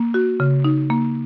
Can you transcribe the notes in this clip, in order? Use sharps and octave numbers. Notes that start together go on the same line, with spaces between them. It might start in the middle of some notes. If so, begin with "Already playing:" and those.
Already playing: A#3
F#4
C#3
D#4
A#3